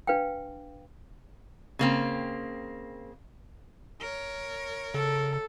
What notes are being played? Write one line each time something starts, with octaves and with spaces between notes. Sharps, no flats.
D4 B4 F5 G5
C#3 A#3 C4
A#4 C#5
C#3 A4